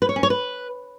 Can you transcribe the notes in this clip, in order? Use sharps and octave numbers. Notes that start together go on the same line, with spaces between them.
B4
C#5
C#4
C#5
B4